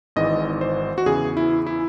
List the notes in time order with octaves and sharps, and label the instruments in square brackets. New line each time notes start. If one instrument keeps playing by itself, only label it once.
[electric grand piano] G#1 G#2 E3 D#5
C5
F#4
E2 C#3 E3 G#4
E4
E4